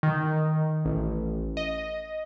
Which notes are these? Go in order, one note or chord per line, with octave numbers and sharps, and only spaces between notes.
D#3
A1
D#5